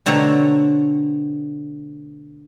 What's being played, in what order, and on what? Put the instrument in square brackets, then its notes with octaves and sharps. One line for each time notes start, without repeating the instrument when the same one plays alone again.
[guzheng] B2 D3 A3 C4 C#5 A#5